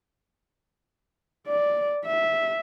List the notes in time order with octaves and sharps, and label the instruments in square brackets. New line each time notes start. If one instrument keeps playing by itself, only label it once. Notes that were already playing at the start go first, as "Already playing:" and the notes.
[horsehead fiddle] D5
E5